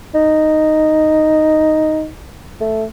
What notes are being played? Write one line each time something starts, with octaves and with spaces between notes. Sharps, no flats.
D#4
A3